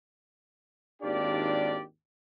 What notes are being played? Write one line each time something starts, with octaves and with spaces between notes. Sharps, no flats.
G#1 D#2 D4 F4 G4 D5